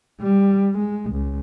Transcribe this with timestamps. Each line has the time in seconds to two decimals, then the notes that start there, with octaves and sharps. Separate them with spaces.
0.21 G3
0.78 G#3
1.11 C#2